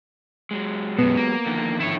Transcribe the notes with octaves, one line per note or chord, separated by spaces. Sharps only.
F#3 G#3
F#2 B2 B3
A#3
D3 D#3 F3
E4 C#5